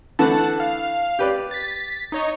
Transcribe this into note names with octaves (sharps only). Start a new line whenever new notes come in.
D3 E3 A3 F#5 A5
F5
G4 B4 D5
A6 B6
D#4 C#5 D#5